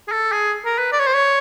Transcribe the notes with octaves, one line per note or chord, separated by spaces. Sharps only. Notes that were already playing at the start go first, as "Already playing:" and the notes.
G#4
A4
G#4
A#4
B4
D5
C#5
C5
C#5